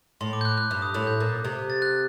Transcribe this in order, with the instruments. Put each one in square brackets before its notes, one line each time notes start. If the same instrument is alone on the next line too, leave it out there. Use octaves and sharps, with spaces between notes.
[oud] A2 [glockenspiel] C6
[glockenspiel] D6
G6
F#6
F#6
[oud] G2 [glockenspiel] F#6
[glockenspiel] D#6
[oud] A2
[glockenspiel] G6
[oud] A#2
C3
[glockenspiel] A6
F#6